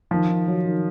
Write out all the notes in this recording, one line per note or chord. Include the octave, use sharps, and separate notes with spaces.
D#3 F3
D#3
F#3
D#3